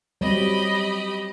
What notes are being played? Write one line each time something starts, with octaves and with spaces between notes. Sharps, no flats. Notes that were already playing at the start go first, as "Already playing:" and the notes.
F#3 G3 C4 G4 D#5 B5